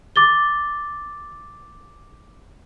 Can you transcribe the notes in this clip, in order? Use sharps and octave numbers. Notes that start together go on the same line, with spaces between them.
D6 A6 G7